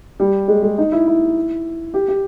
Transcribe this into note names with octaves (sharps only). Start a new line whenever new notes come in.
G3
G#3
G#3
D#4
E4
E4
G4
G4